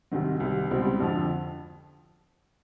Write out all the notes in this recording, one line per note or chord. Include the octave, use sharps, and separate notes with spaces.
C2 C3 D#3 F#3
C2 C3 D#3
C#2 B2 G3 C4 E4
F2 D3 F3